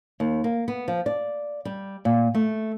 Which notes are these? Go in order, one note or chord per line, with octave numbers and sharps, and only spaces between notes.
D#2
A#3
B3
F3
D5
G3
A#2
A3